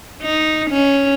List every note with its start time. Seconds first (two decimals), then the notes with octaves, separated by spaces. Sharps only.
0.22 D#4
0.70 C#4